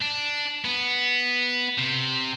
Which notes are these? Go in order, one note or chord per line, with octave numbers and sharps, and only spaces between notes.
D4
B3
C3